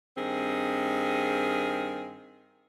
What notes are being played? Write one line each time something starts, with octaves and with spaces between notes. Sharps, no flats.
G2 D#3 C4 G#4